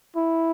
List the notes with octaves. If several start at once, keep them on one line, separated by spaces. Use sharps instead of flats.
E4